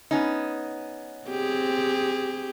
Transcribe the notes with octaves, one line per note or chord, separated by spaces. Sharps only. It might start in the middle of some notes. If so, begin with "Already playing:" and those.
B3 C#4 D#4
C4 G4 G#4